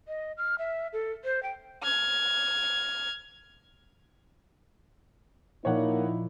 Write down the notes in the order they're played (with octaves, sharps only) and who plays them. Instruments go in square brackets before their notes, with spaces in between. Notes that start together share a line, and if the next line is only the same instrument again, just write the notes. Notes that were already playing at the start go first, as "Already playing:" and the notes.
[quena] D#5
F6
E5
A4
C5
G5
[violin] F6 G#6
[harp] A#2 F3 [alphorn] A#3 [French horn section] D#4 E4 [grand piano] C#5 F#5